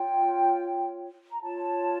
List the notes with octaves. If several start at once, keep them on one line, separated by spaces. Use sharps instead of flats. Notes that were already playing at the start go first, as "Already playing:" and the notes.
Already playing: F4 C#5 G5
A#5
F4 C#5 A5